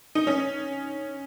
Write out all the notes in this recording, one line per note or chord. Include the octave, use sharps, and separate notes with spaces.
D#4
C#4